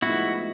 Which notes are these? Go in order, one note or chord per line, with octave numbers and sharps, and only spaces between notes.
A2 F3 G#3 B3 D#4 E4 F#4